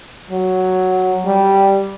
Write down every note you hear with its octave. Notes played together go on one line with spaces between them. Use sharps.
F#3
G3